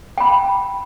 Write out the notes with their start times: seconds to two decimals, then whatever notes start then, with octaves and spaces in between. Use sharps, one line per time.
0.18 G5 B5